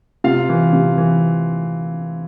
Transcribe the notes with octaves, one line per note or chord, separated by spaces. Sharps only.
C3 F4 F5
E3
C3
E3